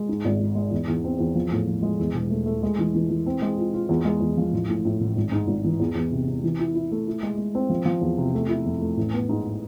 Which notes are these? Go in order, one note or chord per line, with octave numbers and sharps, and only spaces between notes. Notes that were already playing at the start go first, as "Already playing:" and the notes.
Already playing: G#3
G#2
G#1
G#3
G#3
E2
E2
C4
E2
F3
A2
F3
G#3
E2
E1
A3
A3
G#3
E3
E3
E3
C4
G#3
F4
F4
E2
G#3
E2
F3
A1
A2
A2
A1
G#1
G#2
G#1
E3
E2
E2
C3
C3
E3
E4
E4
A3
E4
G#3
G#3
C4
F3
F3
E2
C3
A3
E4
F2
A3
A1
B3
G#2